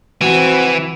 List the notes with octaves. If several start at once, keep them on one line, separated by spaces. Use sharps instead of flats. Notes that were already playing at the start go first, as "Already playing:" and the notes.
E3 C4 F#4